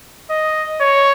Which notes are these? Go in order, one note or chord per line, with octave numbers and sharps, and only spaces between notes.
D#5
C#5